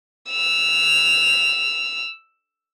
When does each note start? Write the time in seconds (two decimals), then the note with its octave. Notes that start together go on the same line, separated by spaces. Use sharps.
0.30 E6 F7